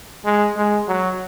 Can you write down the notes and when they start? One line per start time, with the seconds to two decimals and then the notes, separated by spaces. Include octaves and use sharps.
0.25 G#3
0.57 G#3
0.88 F#3